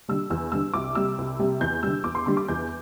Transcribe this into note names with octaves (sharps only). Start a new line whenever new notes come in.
D3 G3 E6
E2 E6
D3 G3 E6
C2 D6
C3 G3 E6
C2
C3 G3
E2 G6
D3 G3 E6
E2 D6
C6
D3 G3 C6
D6
E2 G6